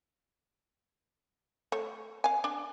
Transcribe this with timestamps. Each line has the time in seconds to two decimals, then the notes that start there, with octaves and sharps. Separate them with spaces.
1.72 A3 C#5
2.24 F5 G#5
2.44 D4